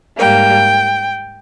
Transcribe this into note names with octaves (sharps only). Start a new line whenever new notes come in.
G#2 G3 A#3 G5